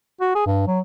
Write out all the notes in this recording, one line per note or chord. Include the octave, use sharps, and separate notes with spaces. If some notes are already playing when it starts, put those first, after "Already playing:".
F#4
G#4
G2
F#3